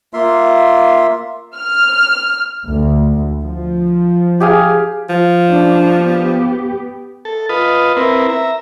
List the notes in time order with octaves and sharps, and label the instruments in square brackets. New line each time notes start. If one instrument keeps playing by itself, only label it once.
[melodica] A#3 F4 E5 C6
[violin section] F6
[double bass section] D2
F3
[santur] G4 G#4 F5
[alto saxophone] F3
[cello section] D4
B3 G4
[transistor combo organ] A4
F4 B4 D#5
C4 E4 A#4 B4
E5 A#5